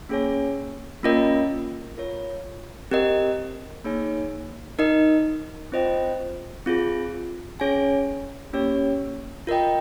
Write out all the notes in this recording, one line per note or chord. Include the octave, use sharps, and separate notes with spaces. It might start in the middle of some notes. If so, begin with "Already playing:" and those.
A#3 C#4 G#4 C#5 G#5
A#3 C#4 F4 A#4 D#5
F4 A#4 C#5
C4 G4 A#4 D#5
A#3 D#4 G#4 C#5 G#5
D#4 A#4 D#5
C4 F4 C5 D#5 G5
C4 F4 G#4
C#4 G#4 C#5 G#5
A#3 C#4 G4 C#5
F4 A#4 D#5 G5